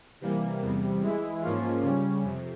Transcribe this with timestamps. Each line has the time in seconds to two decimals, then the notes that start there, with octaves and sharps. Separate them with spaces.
0.21 C3 E3 G3 A#3
0.62 E2 C3 G3
1.02 E3 G#3 E4
1.42 G#2 F3 A#3 C#4 F4
1.82 C#3 G3 C#4
2.23 F2 C3